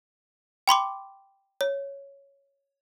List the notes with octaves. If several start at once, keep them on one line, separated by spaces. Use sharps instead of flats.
G5 B5 C6 D6
C#5